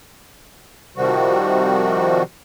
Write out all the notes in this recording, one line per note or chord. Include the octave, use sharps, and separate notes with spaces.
C3 D#3 F3 G3 F#4